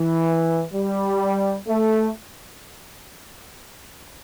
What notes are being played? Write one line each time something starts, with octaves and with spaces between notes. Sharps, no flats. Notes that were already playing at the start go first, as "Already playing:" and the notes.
Already playing: E3
G3
A3